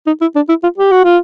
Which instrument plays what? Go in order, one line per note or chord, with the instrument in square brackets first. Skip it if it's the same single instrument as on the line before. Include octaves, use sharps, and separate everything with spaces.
[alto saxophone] D#4
E4
D4
E4
F4
G4
F#4
F4